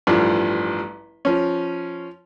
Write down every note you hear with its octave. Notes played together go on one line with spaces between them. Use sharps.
A1 G2 F3
F3 C#4